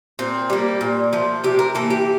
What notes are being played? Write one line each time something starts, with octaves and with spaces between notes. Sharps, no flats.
A#2 C4
G3 A#3
A#2
F3 A3
C3 G4
A#4
E3 A#3 A4
G4